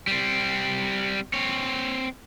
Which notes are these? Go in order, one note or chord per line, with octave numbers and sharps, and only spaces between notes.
G3 C4
C4 C#5